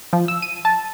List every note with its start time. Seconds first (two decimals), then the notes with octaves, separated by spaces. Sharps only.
0.13 F3
0.28 E6
0.42 D#7
0.65 A5